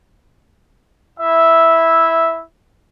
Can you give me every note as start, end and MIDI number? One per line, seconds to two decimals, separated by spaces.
1.19 2.44 64
1.19 2.44 76